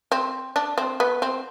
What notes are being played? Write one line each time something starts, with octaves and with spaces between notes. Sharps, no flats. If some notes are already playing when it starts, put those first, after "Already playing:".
C4
D4
C4
B3
C4